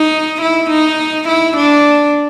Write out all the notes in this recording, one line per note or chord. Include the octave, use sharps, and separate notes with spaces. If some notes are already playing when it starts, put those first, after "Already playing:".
Already playing: D#4
E4
D#4
E4
D4